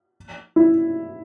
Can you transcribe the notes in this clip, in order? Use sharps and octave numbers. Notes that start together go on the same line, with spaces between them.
E4